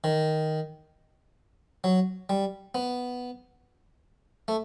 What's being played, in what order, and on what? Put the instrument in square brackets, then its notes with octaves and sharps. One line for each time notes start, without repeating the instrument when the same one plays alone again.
[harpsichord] D#3
F#3
G3
B3
A3